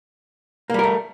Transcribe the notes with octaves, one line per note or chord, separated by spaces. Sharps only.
G3 A3 A#3 A#4